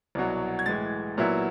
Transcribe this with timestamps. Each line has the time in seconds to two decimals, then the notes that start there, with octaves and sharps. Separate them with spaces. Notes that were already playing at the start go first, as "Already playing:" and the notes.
0.15 C2 B2 F#3
0.59 G#6
0.66 A2 E3 G#3 A6
1.18 A#2 F#3 B3 E4